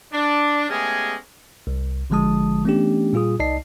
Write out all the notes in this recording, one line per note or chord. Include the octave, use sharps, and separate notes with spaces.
D4
G#3 A3 B3 C#4 G4 G#4
C2
G#1 D3 F3 G#3 A5 D#6
E3 A3 B3 C#4 D4 G4
A#2 G3 F4 G#4 D#6
C2 D#4 D5 D#5 A5 C7